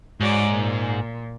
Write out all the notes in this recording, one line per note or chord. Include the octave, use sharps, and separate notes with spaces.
G#2 F#4 C#5 D5
A#2